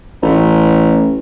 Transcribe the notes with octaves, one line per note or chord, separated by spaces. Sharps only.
A1